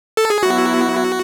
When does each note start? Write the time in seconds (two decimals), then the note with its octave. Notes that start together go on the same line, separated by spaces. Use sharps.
0.17 A4
0.30 G#4
0.43 F#3 B3 E4 F#4